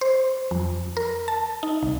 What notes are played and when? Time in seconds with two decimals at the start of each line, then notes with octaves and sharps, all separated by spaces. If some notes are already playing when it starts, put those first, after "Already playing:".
0.01 C5
0.51 F2
0.97 A#4
1.28 A5
1.63 D#4
1.83 C2